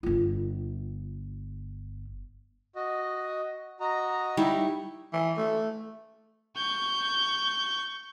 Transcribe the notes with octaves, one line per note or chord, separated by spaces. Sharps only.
G1 F4
F#4 D#5
F#4 D#5 A#5
G3 D#4 E4 C#6
E3
A3
C#6 G6